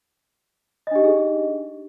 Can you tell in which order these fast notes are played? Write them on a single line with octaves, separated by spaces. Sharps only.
D#5 D4 G4 D#4 G#4